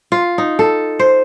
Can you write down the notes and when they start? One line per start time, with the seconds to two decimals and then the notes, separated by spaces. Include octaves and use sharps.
0.12 F4
0.38 D#4
0.59 A4
0.99 C5